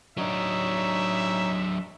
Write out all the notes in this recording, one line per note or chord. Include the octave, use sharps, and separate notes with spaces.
F#3 D4 D#4 C#5 E5